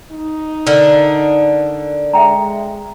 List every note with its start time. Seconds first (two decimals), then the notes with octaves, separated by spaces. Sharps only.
0.11 D#4
0.67 D3 A#4
2.13 G#3 E5 G5 A#5